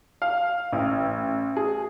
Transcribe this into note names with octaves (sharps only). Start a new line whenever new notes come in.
F5
A1
G#4